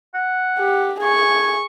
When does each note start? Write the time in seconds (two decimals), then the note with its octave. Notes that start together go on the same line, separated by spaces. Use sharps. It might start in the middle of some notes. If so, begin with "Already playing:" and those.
0.14 F#5
0.59 G4
1.01 G#4 G#5 C#6